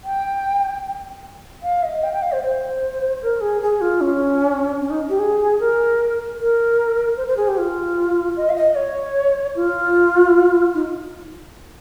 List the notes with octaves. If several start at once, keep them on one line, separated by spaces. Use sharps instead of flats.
G5
F5
D#5
G5
G5
F5
C5
C5
A#4
G#4
G#4
F4
C#4
C#4
D#4
G4
G#4
A#4
A#4
C5
C5
G#4
G4
F4
D#5
F5
D#5
C#5
F4
D#4